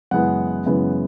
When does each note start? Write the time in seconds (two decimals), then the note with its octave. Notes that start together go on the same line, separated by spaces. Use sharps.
0.11 F#2 C#3 E3 G#3 B3 F#5
0.66 F#2 C#3 E3 G#3 B3